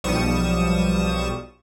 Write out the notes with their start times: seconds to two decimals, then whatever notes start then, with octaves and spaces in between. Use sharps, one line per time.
0.04 B1 F3 G3 C#6 D#6 E7